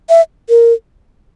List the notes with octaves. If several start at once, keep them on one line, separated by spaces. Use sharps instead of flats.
E5
A#4